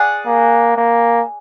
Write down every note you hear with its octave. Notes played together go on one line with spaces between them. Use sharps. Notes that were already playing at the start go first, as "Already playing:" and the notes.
Already playing: G#4 D5 F#5
A#3
A#3